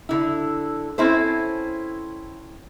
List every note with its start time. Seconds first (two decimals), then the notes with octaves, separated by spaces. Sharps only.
0.09 D3 E4
0.98 C4 C#4 E4 A4 C5